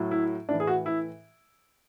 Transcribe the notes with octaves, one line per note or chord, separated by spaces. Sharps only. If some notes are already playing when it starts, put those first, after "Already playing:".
Already playing: A2 F#3
E4
A2 E3 D4
G#4
F#4
E4